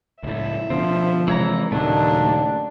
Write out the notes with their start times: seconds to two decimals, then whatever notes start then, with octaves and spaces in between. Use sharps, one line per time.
0.23 C#2 A2 E5
0.70 B2 D3 F3 C4
1.28 C3 E3 G#3 C#5 A#5
1.72 D#2 A#2 C#3 F#3 A3 D4